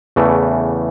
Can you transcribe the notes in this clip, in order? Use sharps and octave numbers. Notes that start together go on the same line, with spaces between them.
E2 C#3 E3 A3